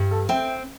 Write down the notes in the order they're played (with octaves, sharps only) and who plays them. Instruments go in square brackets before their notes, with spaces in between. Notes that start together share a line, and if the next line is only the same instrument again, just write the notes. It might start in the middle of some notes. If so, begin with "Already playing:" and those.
Already playing: [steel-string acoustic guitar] G2
[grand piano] A4
[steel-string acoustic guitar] C4 [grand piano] E5 G5